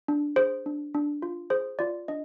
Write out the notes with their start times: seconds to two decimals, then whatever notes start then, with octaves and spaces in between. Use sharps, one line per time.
0.08 D4
0.36 G#4 C5
0.66 D4
0.94 D4
1.22 F4
1.50 G#4 C5
1.79 F4 D5
2.08 D4 D#5